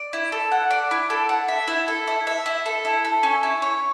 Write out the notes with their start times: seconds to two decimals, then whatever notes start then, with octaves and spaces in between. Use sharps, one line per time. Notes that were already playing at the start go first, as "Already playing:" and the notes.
Already playing: D5
0.13 E4
0.32 A4
0.52 F#5
0.71 D5
0.91 E4
1.10 A4
1.29 F#5
1.48 E5
1.68 E4
1.88 A4
2.07 E4
2.27 E5
2.46 E4
2.66 A4
2.85 E4
3.05 A4
3.23 C#4
3.43 E4
3.62 C#5